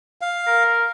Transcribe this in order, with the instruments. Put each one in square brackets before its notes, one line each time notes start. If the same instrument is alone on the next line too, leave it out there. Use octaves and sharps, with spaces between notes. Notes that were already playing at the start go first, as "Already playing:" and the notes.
[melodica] F5
[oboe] A#4